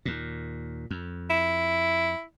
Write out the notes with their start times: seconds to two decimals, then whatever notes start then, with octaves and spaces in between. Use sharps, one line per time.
0.05 D#2 A#2
0.91 F2
1.30 E4